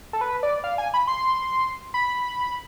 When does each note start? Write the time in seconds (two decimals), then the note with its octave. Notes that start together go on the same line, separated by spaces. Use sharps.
0.13 A4
0.21 B4
0.43 D5
0.64 F5
0.78 G#5
0.94 B5
1.07 C6
1.94 B5